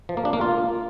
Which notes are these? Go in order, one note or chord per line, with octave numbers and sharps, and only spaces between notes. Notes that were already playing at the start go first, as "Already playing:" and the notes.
F3
A#3
D4
A#3
F4